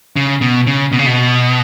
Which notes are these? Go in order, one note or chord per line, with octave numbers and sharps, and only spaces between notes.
C#3
B2
C#3
B2
C#3
B2